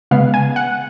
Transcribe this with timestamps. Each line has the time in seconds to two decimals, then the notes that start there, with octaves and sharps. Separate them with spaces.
0.11 C#3 G#3 B3 F5
0.34 G#5
0.56 F#5